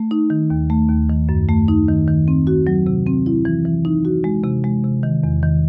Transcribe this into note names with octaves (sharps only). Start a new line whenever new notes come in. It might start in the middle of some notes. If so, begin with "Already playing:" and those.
Already playing: A3
D#4
D#3
D#2
A3
D#2
D#3
F#2
A3
D#4
D#3
D#3
C4
F#4
F#3
C3
C4
E4
E3
E3
D#4
F#4
G#3
C3
G#3
C3
D#3
E2
D#3